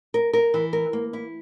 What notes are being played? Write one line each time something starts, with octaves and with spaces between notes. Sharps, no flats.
A#4
A#4
E3
A#4
A#3
E4